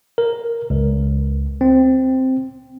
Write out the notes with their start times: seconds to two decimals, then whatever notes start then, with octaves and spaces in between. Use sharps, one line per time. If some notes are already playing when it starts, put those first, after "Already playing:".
0.18 A#4
0.70 C#2
1.61 C4